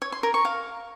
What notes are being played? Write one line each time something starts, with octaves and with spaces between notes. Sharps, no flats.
C#5
C6
A#4
C#6
F5